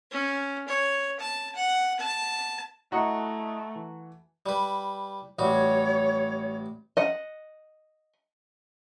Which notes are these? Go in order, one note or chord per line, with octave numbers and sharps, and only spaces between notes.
C#4
C#5
A5
F#5
A5
A3 E4 F#4 D#5 A#5 F#6 C#7
E3
G3 B4
A1 G3 F#4 C#5
D#5 F#5